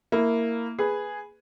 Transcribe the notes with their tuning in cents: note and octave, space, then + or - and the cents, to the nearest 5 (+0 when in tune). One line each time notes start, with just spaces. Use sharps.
A#3 -15 E4 +0
G#4 +0 B4 +0